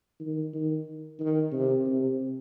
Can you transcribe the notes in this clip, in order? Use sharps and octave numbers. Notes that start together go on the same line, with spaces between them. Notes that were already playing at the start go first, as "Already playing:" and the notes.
D#3
D#3
D#3
C3
C3